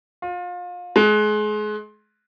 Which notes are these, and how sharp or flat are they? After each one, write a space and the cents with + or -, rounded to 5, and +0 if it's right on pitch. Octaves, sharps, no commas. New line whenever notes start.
F4 +30
G#3 +30